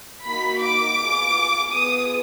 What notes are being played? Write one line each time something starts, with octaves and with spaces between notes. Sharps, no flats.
A#3 D#4 F#4 B5
D6
B3 F4 G#4
B3 F4 G#4 D#6